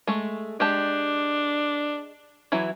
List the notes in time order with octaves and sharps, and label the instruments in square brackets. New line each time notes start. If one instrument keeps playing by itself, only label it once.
[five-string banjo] G#3 A3
[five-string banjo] G#3 G4 A5 [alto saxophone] D4
[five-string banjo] E3 F#3 E4